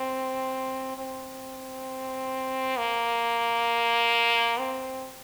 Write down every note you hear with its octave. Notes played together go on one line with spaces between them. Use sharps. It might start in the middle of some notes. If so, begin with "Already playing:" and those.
Already playing: C4
C4
A#3
C4